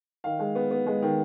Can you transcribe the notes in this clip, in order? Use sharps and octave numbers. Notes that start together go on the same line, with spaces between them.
D#3 F5
G#3
B3
B3
G#3
D#3